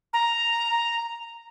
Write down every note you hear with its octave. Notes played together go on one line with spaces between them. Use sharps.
A#5